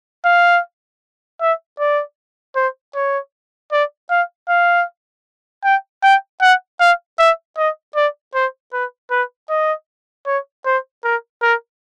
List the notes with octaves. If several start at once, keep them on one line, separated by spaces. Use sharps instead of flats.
F5
E5
D5
C5
C#5
D5
F5
F5
G5
G5
F#5
F5
E5
D#5
D5
C5
B4
B4
D#5
C#5
C5
A#4
A#4